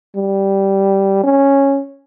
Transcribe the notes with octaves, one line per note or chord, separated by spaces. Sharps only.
G3
C#4